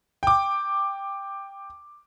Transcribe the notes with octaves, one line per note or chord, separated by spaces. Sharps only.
G5 D6